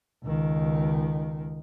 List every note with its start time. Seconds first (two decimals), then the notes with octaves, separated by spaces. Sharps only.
0.24 C#2 D#3